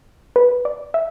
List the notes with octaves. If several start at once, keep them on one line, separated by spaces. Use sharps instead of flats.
B4
D5
E5